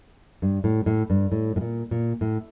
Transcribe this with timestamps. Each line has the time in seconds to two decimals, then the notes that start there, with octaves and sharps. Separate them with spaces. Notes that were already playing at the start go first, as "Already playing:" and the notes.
0.42 G2
0.64 A2
0.86 A2
1.10 G2
1.32 A2
1.56 A2
1.61 A#2
1.91 A#2
2.21 A2